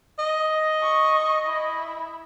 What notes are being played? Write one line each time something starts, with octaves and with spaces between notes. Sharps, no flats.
D#5
C#6
E4